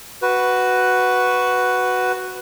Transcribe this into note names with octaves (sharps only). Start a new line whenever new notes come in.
F#4 B4